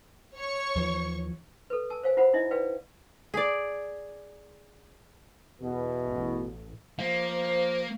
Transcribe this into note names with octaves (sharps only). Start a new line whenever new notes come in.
C#5 C#6
D#2 E3 F3
A4 B4
G#5 A5 E6
C5 C#5 F5 G#5
F4 F#4 C5 F#5 B5
D#4 E4 D#5 E5
B4 D5 F5 G5
G#4 D5
E2 B2
A1
F3 A#3 C5 F5